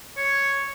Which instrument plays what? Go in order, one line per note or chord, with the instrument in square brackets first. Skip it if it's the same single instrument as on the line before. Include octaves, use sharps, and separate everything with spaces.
[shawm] C#5